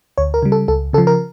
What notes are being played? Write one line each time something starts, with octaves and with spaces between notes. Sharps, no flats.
D2 C#5
A#4
C#3 G3
A4
C#2 A4
C#3 F3 A4
A#4